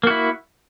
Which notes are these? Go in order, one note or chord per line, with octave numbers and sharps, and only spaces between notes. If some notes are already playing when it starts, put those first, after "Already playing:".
A#3 E4 F#4